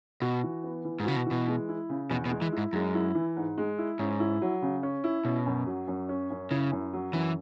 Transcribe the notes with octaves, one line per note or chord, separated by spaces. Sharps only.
B2 F#4
E3
B3
E3
G#2
C#3 F#4
B2
B2 E3
G#3
E4
C#3
E2 B2
B2
G#3
E3
E4
G#2
F#2 G#3
E4
E3
G#2
G#3
E4
G#2 C#4
E4
F#3
C#3
C#4
E4
B2 C#4
F#2
F#3
F#2
C#4
F#2
C#3 E4
F#2
F#3
F#2 E3